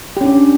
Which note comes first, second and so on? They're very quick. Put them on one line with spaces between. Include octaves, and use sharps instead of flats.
G4 C#4 D4